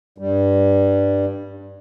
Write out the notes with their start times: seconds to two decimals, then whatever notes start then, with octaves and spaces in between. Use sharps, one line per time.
0.18 G2 G3